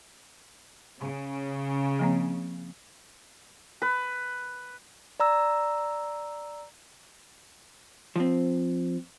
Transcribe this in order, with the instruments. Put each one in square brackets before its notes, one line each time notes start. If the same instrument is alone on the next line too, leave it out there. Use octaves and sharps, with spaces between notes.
[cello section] C#3
[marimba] F3 A#3 C4
[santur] B4
[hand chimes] D5 A#5 E6
[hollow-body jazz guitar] F3 C4